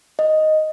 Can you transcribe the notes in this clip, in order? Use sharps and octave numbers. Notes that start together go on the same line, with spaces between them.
D#5